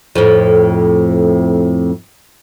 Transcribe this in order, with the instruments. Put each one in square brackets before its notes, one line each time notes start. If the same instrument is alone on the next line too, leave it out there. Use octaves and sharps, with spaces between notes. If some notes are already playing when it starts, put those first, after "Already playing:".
[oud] F2 A2